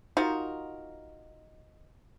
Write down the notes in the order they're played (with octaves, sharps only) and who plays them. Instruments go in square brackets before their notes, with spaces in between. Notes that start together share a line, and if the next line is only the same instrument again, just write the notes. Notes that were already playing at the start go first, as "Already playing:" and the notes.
[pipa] D#4 F4 F#4 A#4